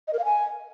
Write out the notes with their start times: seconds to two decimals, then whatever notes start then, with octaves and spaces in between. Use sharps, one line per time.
0.08 D#5
0.13 A#4
0.19 F5
0.25 G#5